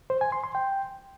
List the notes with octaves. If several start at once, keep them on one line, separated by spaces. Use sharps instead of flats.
C5
G#5
C6
C6
G5